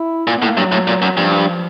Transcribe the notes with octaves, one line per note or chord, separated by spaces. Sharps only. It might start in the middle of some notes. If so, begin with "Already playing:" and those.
Already playing: E4
A#2
B3
A2
A#3
G2 F#3
A2
A#2
F#2
G2 F3